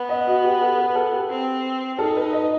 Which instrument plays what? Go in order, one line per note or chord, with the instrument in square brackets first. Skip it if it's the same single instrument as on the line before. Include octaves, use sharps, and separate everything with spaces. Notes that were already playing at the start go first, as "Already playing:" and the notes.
Already playing: [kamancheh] B3
[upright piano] D#5
F#4
G4
A4
B4
A4
G4
[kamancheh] C4
[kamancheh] D#4 [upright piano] A4
[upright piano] B4
D#5